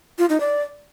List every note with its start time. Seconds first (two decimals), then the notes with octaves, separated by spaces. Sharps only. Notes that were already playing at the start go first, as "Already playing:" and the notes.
0.19 F4
0.29 D#4
0.40 D5